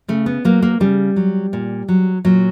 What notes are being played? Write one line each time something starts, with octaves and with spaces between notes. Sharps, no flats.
C#3 A3
B3
F#3 A#3
A#3
C#3 G3
F#3
A#2
F#3
A#2 F#3